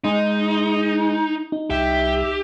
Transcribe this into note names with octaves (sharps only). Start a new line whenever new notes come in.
G#3 D#4
D#4
C2 G4 E5